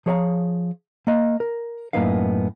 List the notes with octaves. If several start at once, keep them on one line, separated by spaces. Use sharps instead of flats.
F3 G#4 C#5 E5 F5 A#5
A#3 D#5
A#4
F#2 A2 A#3 B3 D#4 F5